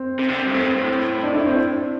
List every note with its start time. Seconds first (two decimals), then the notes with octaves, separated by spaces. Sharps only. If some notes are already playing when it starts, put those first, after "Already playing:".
Already playing: C4
0.19 C3
0.29 D3
0.37 C3
0.46 G2
0.54 A2 C4
0.66 G2
0.78 A2
1.23 D4
1.35 E4
1.46 C4